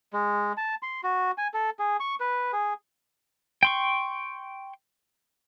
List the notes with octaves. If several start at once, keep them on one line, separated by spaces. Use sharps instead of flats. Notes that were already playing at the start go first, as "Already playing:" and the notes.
G#3
A5
C6
F#4
G#5
A4
G#4
C#6
B4
G#4
G5 C6 C#6